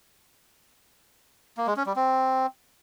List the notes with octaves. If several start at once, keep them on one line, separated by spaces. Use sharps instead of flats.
A#3
G#3
C#4
G3
C4